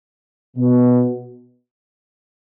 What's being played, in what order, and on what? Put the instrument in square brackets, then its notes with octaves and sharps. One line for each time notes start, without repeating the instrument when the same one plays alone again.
[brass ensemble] B2